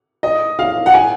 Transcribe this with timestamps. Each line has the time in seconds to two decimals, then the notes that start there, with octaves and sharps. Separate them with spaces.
0.23 D#5
0.59 F5
0.86 F#5
0.94 G#5